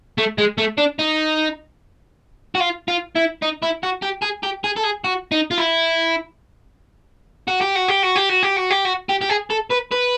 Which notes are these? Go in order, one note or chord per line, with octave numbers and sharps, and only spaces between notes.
A3
G#3
A3
D4
D#4
F#4
F4
F4
E4
D#4
E4
F#4
G4
G#4
G4
G#4
A4
G#4
F#4
D#4
F4
E4
F#4
G4
F#4
G4
F#4
G4
F#4
G4
F#4
G4
F#4
G4
G4
G#4
A4
B4
B4